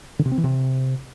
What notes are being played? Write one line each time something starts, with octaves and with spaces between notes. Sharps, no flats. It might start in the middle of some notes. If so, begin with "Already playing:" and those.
D3
C3
C4
E3
C3